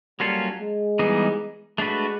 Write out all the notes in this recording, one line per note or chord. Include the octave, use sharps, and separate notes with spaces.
F#3 G3 A#3 C#4 F4 A4
G#3
E3 G3 B3 D#4 G#4
G#3 A3 D4 F#4 B4